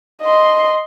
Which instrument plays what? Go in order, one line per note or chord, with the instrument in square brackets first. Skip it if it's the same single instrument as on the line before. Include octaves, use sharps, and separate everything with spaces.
[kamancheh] D#5 C6